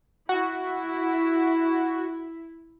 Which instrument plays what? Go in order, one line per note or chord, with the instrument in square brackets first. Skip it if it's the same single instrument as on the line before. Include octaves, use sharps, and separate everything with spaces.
[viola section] E4 [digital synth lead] F#4